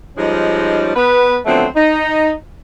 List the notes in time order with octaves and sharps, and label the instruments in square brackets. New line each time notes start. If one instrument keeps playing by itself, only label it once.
[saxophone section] F3 G3 G#3 C#4 D#4
B3 B4
D3 F3 F#3 A3 B3 C4
D#4